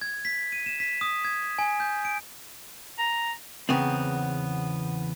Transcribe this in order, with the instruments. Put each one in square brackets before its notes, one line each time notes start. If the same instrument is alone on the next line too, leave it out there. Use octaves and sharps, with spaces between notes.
[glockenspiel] G#6
B6
D#7
E7
B6
D#6
G#6
G#5
G6
D7
[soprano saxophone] A#5
[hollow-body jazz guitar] E2 C#3 B3 C4